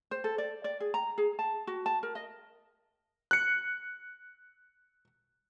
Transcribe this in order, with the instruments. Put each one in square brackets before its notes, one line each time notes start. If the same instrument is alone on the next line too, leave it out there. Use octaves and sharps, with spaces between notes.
[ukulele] C5
A4
D5
D5
G#4
A#5
G#4
A5
F#4
A5
A#4
D#5
[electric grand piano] F#6 C#7